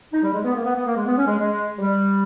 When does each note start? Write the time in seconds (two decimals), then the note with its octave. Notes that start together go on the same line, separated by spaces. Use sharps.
0.13 D#4
0.23 G3
0.34 G#3
0.44 B3
0.55 A#3
0.65 B3
0.75 B3
0.86 A#3
0.96 G#3
1.07 B3
1.17 C#4
1.27 G#3
1.38 G#3
1.79 G3